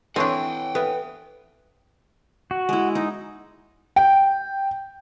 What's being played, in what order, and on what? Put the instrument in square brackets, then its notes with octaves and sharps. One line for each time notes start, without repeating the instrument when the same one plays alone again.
[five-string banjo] E3 C#5 [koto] C4 D4 [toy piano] A4 [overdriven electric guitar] F#5 G5
[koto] B3 [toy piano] A4 B4 E5
[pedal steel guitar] F#4
[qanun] G#3 E4
D#4
[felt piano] G5